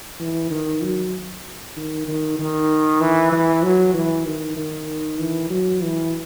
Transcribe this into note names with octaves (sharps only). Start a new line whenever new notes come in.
E3
D#3
F#3
D#3
D#3
D#3
E3
E3
F#3
E3
D#3
D#3
E3
F#3
E3